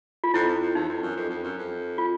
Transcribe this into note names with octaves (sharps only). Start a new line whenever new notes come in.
F4
F2 E4
F2
F2
E2 D#4
F2
F#2
F2
F2
F#2
F2
F4